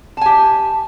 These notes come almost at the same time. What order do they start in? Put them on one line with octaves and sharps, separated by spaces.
A5 G#5 G4